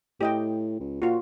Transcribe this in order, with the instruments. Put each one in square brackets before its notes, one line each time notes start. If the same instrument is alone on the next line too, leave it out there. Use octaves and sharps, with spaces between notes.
[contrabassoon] A2 [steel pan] G4 D#5 G5
[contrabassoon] C#2
[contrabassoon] A#2 [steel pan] F4 F#4